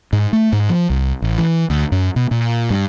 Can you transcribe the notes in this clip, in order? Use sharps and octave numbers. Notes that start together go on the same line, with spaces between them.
G#2
A3
G#2
F3
C2
A1
E3
D2
F#2
B2
A#2
G2